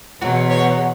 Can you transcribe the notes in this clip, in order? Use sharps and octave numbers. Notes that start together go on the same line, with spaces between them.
E2 B2 F#3 F#4
C#5